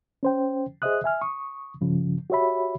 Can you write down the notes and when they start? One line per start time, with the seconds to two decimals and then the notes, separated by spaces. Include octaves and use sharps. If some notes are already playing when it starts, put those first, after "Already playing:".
0.23 C#4 C5 G5
0.82 G#4 C5 D#5 E5 D#6 F#6
1.04 E5 G#5 F6
1.21 C#6 D#6
1.81 G2 C#3 F3
2.30 F#4 G4 C#5 E5 B5